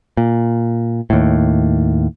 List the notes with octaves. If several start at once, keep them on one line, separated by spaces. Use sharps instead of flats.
A#2
D#2 A2